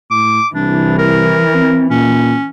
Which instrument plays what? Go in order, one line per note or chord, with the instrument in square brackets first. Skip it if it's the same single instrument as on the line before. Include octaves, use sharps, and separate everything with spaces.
[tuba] A2 [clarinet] D6
[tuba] C2 [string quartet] E3 [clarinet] D4
[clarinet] A#4
[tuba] C4
[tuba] A#2 [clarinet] C#4